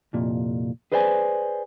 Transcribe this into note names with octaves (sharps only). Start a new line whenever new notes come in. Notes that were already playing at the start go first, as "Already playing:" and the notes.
C2 F2 A#2
G#4 B4 C5 D5 F#5 G#5